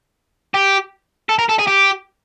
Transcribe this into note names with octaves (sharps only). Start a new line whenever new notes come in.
G4
A4
A#4
A4
G#4
G4